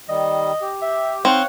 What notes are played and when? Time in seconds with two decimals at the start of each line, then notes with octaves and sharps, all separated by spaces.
0.09 D#3 G3 D#5
0.62 G4
0.82 E5
1.25 C4 D#4 C#5 F5 F#5